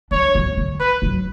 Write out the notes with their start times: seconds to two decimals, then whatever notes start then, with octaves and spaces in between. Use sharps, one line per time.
0.11 D4 C#5
0.35 B3
0.57 D3
0.80 B4
1.02 F#3